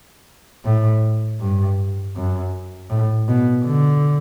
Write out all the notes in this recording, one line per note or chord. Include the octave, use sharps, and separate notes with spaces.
A2
G2
F#2
A2
B2
D3